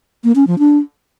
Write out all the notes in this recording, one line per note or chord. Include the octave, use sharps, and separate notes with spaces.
A#3
C#4
F3
D4